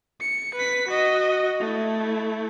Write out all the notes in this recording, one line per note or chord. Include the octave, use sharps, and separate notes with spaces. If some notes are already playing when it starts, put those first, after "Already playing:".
C#7
B4 B6
F#4 D#5
A3 E4